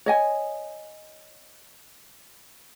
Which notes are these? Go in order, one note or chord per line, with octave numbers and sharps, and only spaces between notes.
C#5 D#5 G#5